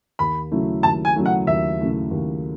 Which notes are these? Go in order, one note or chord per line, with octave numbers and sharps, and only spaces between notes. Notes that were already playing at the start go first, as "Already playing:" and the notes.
D#2 B5
C#3 F#3 A3 E4
D#2 A5
G#5
C#3 F#3 A3 E4
F#5
D#2 E5
C#3 F#3 A3 E4
D#2